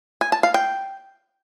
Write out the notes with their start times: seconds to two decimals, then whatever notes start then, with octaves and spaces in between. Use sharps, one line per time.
0.21 G#5
0.32 A5
0.43 F5
0.54 G5